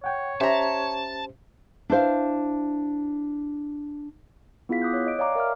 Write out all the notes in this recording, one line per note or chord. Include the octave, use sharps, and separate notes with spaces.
C#5 F#5 G5
C#4 G4 C5 E5 A5 A#5
D4 E4 C5 F5
B3 E4 F4 G#4 F5 B6
D6 D#6 F#6 G6
C#5 F#6
D#5 D7
C#5 D5 F5 G5 A#5 D6
A#4 E5 F5 A#5 F6